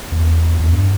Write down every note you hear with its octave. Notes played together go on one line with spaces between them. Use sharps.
E2
E2
G2